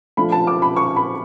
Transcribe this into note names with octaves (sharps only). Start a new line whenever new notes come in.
F3 A3 D4 F4 B5
A5
D6
B5
C#6
B5